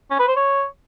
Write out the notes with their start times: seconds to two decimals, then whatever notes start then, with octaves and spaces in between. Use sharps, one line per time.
0.11 C#4
0.19 B4
0.28 C5
0.36 C#5